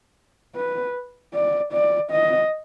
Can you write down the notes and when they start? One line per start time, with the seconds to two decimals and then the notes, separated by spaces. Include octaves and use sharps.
0.56 B4
1.33 D5
1.73 D5
2.11 D#5